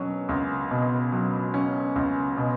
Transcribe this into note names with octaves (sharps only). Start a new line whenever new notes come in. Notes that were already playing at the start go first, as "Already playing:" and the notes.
Already playing: B2 F#3 C#4
C#2
B2
F#3
C#4
C#2
B2